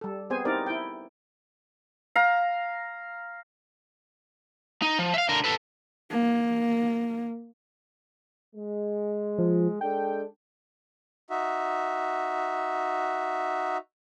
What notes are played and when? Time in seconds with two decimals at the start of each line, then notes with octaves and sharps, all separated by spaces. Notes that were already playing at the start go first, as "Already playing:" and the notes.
0.01 G3 A4
0.30 B3 C4 G#4 C5 G#5
0.45 C4 D#4 E4 G4 A#4 D5
0.67 E4 G5
2.16 F5 A#5
4.82 D#4
4.99 F3
5.14 E5 F5
5.29 D3 A#4
5.44 A4 B4
6.11 A#3
8.55 G#3
9.38 F3
9.81 G#3 D4 A4 G5
11.30 D#4 F#4 E5